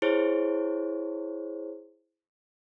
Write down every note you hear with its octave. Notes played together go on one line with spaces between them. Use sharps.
E4 G#4 C5 C#5